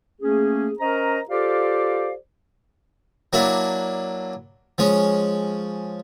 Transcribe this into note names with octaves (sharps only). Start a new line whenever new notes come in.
A3 A#3 C#4 G#4
C#4 A#4 C5 D#5 A#5
F4 G4 A4 C5 D5 F5
F#3 A#3 D4 E4
F3 G#3 C#4